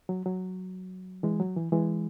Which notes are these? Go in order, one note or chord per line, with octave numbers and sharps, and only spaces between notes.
F#3
F#3
E3 G#3
F#3
E3
E3 G#3